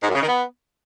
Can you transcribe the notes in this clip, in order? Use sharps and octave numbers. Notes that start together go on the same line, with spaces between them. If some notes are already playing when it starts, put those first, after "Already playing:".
G#2
F#2
C#3
D#3
B3